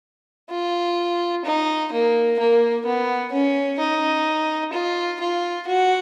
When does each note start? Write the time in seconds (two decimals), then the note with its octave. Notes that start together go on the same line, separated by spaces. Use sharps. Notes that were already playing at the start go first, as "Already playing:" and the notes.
0.50 F4
1.45 D#4
1.92 A#3
2.39 A#3
2.85 B3
3.32 C#4
3.79 D#4
4.73 F4
5.20 F4
5.67 F#4